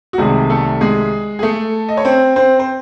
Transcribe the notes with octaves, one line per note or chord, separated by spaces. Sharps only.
F#4
C2 C3 D#3 G#3 A3 G#4
A3 A4
G#3 G#4
G#4
A3 A4
D#5
C#5
C4 C5
C4 C5
C5